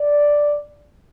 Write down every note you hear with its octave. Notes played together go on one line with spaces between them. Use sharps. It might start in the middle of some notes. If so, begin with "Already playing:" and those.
Already playing: D5